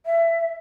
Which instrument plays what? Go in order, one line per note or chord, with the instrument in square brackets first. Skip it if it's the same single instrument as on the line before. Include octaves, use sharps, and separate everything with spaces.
[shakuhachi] E5